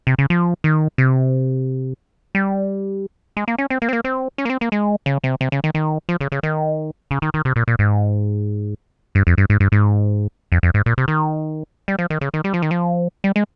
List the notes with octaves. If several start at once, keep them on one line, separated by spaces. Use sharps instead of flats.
C3
C#3
F3
D#3
C3
G3
G#3
A#3
C#4
C4
A#3
C4
A#3
C4
C#4
A#3
C4
A#3
G#3
C#3
C3
C3
C#3
D#3
D#3
F3
C#3
C#3
D#3
C#3
D#3
D#3
C3
A#2
A#2
G#2
G2
F2
G2
G#2
G2
G#2
F2
F2
G#2
A#2
C3
D#3
G3
F3
D#3
C#3
D#3
G3
F3
D#3
F3
G3
G#3